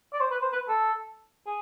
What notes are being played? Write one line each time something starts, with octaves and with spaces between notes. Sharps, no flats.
D5
C5
B4
C5
B4
A4
G#4